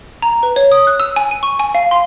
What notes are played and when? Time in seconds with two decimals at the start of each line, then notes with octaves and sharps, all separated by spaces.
0.22 A#5
0.43 B4
0.56 C#5
0.72 D#6
0.87 F#6
1.00 E6
1.16 G#5
1.31 D#7
1.43 C#6
1.59 G#5
1.75 F5
1.91 C6